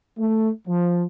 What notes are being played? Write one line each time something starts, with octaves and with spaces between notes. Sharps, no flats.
A3
F3